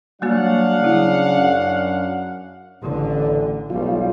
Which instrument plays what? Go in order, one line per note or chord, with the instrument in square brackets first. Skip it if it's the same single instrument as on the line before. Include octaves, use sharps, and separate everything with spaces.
[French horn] F#3 [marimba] G3 A#3 F#4 [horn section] D4 F5 F#5
[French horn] C#3 [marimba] F#3 E4
[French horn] F#2
[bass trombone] A1 [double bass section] D3
[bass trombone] B1 [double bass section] G3 [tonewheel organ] F4